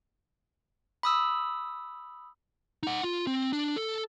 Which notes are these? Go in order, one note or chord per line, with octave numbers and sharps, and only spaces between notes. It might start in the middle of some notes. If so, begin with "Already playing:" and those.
B5 D#6 E6
D#4 F#5
F4
C4
D4
A4